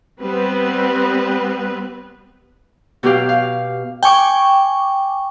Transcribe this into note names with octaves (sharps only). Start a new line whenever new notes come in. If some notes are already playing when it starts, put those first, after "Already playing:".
G3 B3 C4 B4
B2 F#3 G4 F5
F5
G5 G#5 C#6 D6